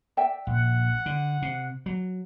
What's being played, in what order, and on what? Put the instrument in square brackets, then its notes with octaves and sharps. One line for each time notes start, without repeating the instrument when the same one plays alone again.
[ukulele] D5 E5 G5
[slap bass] A#1 [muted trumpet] F#5
[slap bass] D3
C3
F#3